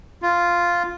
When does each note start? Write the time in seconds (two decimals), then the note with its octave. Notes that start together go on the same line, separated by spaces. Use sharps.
0.22 F4